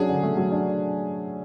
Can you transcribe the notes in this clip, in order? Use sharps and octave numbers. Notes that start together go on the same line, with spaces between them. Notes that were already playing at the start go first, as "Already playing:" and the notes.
Already playing: F#3 C#4 D4 G#4
D3
A3
F#3
D4